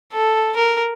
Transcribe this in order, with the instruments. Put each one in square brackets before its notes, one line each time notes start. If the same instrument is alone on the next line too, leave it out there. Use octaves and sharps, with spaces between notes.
[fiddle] A4
A#4